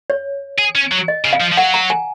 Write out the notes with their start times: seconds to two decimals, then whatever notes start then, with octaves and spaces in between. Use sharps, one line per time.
0.10 C#5
0.58 G#4
0.75 C#4
0.92 F#3
1.08 D#5
1.25 C#3
1.33 F5
1.41 F3
1.53 F3
1.57 F#3 F#5
1.74 A#5
1.90 G#5